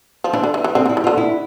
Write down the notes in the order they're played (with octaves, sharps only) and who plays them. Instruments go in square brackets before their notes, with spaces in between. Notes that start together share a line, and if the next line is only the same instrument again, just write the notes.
[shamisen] F3
[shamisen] E3 [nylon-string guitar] D4
[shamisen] D3
E3
E3
[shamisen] D3 [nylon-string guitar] C4
[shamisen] D3
[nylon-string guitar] E4
[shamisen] E3
[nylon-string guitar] F4
[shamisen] D3
[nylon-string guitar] E4